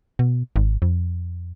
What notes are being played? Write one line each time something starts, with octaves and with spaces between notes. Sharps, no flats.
B2
G#1
F2